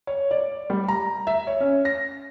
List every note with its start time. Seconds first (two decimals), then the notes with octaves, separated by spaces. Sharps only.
0.07 C#5
0.31 D5
0.70 G3
0.88 A#5
1.27 E5
1.47 C#5
1.61 C#4
1.85 A#6